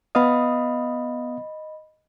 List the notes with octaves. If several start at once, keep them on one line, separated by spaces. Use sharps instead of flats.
B3 D#5 F5 B5 D#6